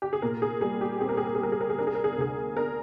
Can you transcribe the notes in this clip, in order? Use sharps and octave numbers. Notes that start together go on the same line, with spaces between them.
G4
G#4
A#2 A#4
G#4
G3 G#4
G4
C4 G#4
A#4
G#4
A#4
G#4
G3 A#4
G#4
A#4
G#4
D4 A#4
G#4
A#4
G#4
A#4
D2 G#4
D4 A#4